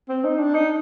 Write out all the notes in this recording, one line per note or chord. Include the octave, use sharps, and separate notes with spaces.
C4
D#4
D4
D#4